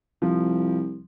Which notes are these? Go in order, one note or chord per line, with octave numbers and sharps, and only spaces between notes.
C2 F3